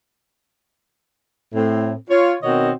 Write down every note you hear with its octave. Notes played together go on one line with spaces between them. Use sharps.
A2 C4
F4 C#5
B2 D#3 C4 F#4 C#5 D#5